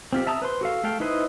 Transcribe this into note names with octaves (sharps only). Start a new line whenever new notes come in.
C4 F4 G4
E5 A5 A#5 D#6 E6
B4 C5 C6
F#4 A4 F5
A3 A4 F5 G5
D#4 E4 B4 C5 D#5